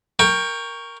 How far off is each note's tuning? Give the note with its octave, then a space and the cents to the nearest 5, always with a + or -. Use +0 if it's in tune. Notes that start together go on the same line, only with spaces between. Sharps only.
A#4 +0 G5 +20 C#6 +5